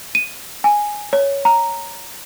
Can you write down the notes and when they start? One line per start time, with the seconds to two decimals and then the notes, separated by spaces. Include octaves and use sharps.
0.15 D#7
0.64 G#5
1.13 C#5
1.45 A#5